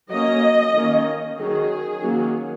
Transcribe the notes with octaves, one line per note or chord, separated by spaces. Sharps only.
F#3 A#3 C#4 D#5
D#3 A#3 C#4
D#3 F#3 C#4 G#4
D#3 F#3 A#3 C#4